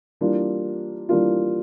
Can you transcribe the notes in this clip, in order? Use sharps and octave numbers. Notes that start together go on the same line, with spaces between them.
E3 G3 A#3 D4 F4
E3 G3 A#3 D4 F4